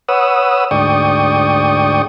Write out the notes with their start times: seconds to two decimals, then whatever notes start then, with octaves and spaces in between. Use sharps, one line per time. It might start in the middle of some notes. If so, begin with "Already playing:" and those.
0.09 B4 C#5 F#5 D#6 E6
0.71 D2 G#2 D5 G5 C#6 D#6